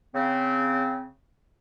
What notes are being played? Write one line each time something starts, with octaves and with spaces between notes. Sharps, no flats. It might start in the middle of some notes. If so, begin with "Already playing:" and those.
C#3 C4